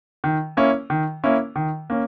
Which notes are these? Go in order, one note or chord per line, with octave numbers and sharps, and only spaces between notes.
D#3
A#3 C#4 E4
D#3
A#3 C#4 E4
D#3
A#3 C#4